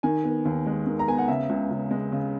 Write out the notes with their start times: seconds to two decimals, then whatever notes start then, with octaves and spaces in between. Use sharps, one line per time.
0.03 D#3 G#5
0.24 B3
0.45 D#2
0.66 G#3
0.87 D#3
0.99 A#5
1.08 B3 G#5
1.18 F#5
1.28 C#3 E5
1.49 C#2
1.71 C#2
1.91 G#3
2.12 C#3